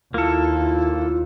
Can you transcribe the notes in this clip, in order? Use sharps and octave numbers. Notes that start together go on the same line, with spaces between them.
D#2 A#3 E4 F4 A4